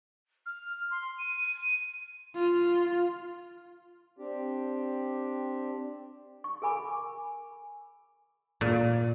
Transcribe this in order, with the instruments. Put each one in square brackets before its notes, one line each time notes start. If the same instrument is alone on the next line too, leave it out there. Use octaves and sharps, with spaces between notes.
[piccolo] F6
C6
D#7
D#7
[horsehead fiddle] F4
[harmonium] C4 D4 G4
[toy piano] C#6
G#4 A#4 G#5 B5 D6
[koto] A#2